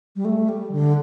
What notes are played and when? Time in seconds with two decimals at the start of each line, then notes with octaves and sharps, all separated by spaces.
0.16 G3
0.25 A3
0.49 G3
0.72 D3